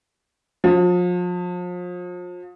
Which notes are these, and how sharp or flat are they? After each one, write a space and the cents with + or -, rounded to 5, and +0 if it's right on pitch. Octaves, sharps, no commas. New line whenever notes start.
F3 +35